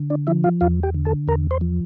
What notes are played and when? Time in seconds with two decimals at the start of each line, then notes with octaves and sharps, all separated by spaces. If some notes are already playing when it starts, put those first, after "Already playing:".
Already playing: D3
0.10 D4 D5
0.27 F3 E4 E5
0.44 F4 F5
0.61 E2 F4 F5
0.83 G4 G5
0.94 D3
1.05 A4 A5
1.28 E2 A#4 A#5
1.51 C5 C6
1.61 F3